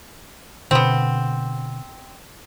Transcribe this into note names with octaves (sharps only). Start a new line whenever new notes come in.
B2 D3 B3 C4